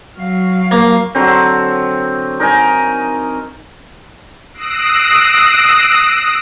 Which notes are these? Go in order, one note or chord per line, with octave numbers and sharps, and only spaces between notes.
F#3 F5
A#3
D3 F#3 C4
D#4 A#4 D#5 G#5
D#6 E6 F#6 A#6 C7 D7